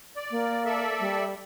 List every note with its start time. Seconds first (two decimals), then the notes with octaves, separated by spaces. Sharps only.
0.16 D5
0.31 A#3
0.65 A4 D5 E5
1.00 G3